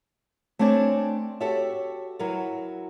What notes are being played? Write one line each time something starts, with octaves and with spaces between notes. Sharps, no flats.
A3 C4 D4 C#5 G#5 A5
F#4 G4 A4 C#5 E5
F#3 E4 F#4 A#4 B4